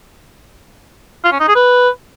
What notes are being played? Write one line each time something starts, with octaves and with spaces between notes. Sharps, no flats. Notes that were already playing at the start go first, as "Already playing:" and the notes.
F4
C#4
D#4
G#4
B4